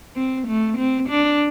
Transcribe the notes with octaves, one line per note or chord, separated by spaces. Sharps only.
C4
A3
C4
D4